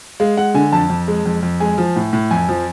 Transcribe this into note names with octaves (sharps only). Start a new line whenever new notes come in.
G#3 F5
G#3 F#5
D3 G#5
F2 A5
F2
G#3
F2
F2
G#3 G#5
F3
A2
A2
F2 G#5
F3